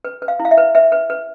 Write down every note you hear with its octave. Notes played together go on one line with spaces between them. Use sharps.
B4
B4
F5
E4
F5
E5
B4
B4 E5
B4
B4